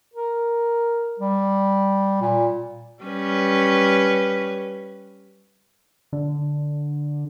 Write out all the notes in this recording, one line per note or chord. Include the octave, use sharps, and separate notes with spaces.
A#4
G3
A#2
G3 C#4 B4
D3